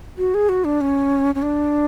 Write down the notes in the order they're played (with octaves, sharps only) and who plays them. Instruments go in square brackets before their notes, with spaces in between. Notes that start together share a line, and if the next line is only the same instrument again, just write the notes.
[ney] F#4
G#4
F#4
D4
C#4
C#4
D4